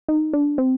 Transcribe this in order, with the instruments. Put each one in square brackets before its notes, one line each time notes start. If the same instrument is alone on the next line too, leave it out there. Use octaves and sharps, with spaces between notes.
[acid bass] D#4
D4
C4